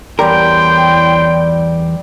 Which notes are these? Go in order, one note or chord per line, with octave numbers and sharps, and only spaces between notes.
E2 G3 E4 G4 A#4 C#5 G5 C6